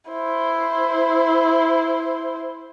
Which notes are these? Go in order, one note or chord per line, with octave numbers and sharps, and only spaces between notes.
E4 C5